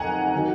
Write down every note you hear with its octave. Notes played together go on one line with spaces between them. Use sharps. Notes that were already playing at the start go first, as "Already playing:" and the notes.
Already playing: F2 D#3 F#5 G#5 A#5
D#3 F#3